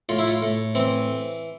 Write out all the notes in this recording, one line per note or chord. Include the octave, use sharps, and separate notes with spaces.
A2 F4
E4
F4
A2
E3 C4